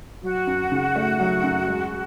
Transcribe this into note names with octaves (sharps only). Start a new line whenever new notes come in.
F#3 F#4
F#2
C#3
A3
F#3
F#2
G#3